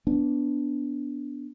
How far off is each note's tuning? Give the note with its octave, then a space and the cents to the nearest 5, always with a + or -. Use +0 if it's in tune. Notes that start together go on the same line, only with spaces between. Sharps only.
B3 +0 D4 -15